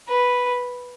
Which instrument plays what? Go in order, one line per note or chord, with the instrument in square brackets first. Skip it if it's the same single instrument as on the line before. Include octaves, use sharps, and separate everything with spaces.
[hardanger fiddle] B4